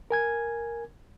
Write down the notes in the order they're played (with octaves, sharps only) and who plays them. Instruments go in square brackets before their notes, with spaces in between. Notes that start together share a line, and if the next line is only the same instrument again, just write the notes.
[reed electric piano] A#4 G#5 G#6